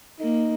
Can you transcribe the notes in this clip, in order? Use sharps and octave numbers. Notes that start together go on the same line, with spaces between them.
A#3 D#4